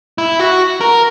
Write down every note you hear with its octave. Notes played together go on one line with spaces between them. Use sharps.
E4
F#4
A#4